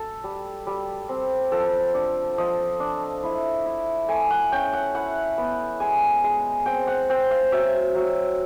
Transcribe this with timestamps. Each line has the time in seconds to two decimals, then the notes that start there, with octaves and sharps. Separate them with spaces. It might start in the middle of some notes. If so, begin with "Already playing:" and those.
Already playing: A4
0.24 G3
0.67 G3
1.09 C4
1.52 F3 A4
1.94 D4
2.38 F3 D#5
2.80 D4
3.24 E4
3.66 E4
4.09 A3 G#5
4.31 F#5
4.52 C#4 G5
4.73 F#5
4.95 E4 F#5
5.38 B3
5.80 G#3 G#5
6.24 G#3
6.66 C4 G5
6.87 F#5
7.09 C4 G5
7.31 F5
7.52 F#3 E5
7.95 F#3